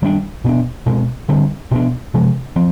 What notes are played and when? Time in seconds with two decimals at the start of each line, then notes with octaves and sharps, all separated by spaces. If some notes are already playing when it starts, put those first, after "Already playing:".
0.02 D#3 G3 B3 D4
0.44 B2 B3 D4
0.86 B2 G#3 C4
1.28 D3 G3 C4
1.71 B2 B3 D4
2.14 C3 F3 G#3
2.56 F3 C4